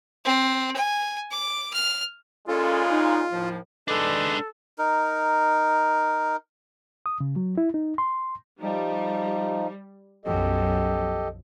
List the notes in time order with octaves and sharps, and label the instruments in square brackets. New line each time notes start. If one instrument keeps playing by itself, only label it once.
[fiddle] C4
G#5
D6
F6
[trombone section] A#2 C#3 G#3 [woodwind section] C#4 A4 [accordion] F4
[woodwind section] D#4
D#2 A2 F3
[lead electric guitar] G#3 D4 [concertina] D#4 B4 D5 [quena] A4
[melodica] D#4 A#4
[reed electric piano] D#6
C#3
F#3
E4
D#4
C6
[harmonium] F3 D#4 [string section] G3
[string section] B1 F#2 F3 [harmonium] G4 A4 D#5